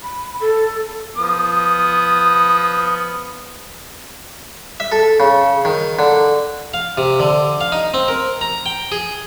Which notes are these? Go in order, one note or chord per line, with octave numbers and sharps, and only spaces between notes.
B5
A4
F3 B3 D#6
E5
A4
C#3
D#3
D3
F5
C3
D3
F5
D#4
C4
A#4
A#5
G5
G#4